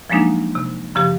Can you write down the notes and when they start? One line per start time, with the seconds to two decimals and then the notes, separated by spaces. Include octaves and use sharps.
0.10 F3 F#3 G#3 A#3 D4 D#4
0.55 C3
0.95 F#2 C#3 F3 G4